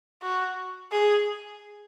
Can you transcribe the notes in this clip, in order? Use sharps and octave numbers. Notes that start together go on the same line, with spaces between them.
F#4
G#4